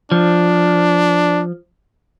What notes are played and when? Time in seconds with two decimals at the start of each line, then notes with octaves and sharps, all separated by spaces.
0.12 F3 D4